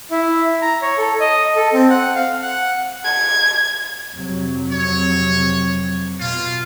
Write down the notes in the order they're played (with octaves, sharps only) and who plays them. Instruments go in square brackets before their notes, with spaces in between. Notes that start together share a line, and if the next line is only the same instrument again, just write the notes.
[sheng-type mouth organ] E4
A#5
C#5
A4
D#5
A4
C4
F#5
F5
F#5
[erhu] G#6
[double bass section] F2 C3 F#3
[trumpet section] C#5
[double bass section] B2 [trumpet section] F4